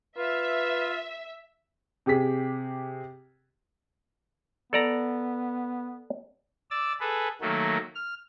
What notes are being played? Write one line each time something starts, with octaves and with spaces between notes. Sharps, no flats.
F4 B4 E5
C3 G4 G#4 B6
B3 A4 D5 A#5
D5 E6 A6
G#4 A4 B4
D#3 F#3 A3 A#3
F6